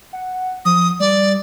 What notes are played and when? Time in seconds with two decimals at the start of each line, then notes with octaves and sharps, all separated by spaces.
0.13 F#5
0.65 F3 D#6
1.00 G3 D5